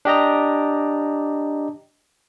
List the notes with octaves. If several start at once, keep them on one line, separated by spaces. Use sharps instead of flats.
D4 G4 D#5 A#5